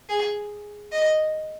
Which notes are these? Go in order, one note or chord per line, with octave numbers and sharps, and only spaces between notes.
G#4
D#5